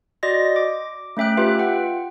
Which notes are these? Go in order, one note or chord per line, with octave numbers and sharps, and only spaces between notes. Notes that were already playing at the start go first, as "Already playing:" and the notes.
F#4 D5 D#5 C6 A#6
D6
A3 C#4 E5 G5 F#6
F4 G4 B4 E5
F4 F#5 G5